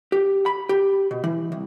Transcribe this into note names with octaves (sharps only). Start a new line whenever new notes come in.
G4
B5
G4
B2
E3
C2